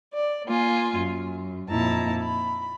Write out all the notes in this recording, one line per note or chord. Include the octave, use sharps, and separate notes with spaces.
D5
A#3 F4 G#5
F#2
F2 A#2 D#4 E4 A5 A#5
B5